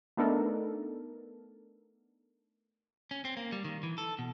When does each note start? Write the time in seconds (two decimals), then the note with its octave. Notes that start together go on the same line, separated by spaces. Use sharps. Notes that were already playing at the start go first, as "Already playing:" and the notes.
0.17 A3 B3 D4 D#4 A4 A#4
3.11 C#4
3.25 C4
3.37 A#3
3.52 G3
3.64 D#3
3.83 E3
3.98 A4
4.19 B2